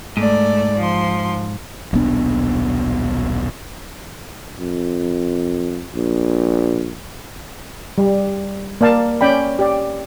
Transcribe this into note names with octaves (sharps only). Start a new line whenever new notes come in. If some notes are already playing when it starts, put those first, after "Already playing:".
G#2 A3 D5
F3 C6
D#1 B1 B3 D4
F2
A#1
G3
A#3 D5 F5 A5
C#4 D5 G5 B5
G4 D5